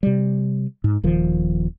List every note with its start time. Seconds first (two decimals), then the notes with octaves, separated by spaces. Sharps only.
0.03 C3 G3
0.84 G#2
1.03 D#1 D#3 F3